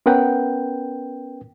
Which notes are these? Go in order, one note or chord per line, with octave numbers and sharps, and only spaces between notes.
B3 C#4 A#4 B4 F#5 G5